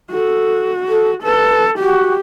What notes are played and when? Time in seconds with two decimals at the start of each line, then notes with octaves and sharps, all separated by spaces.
0.11 F#4 A4
0.87 A4
1.23 A4 B4
1.79 F#4 G4